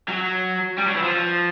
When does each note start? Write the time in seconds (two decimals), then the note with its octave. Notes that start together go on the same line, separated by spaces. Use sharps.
0.08 F#3
0.78 G3
0.87 F#3
0.95 E3
1.03 F3